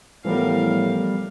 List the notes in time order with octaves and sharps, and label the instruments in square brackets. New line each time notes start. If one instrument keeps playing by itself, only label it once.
[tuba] A2 [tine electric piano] E3 F3 B3 [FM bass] G3 [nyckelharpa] A#4 F5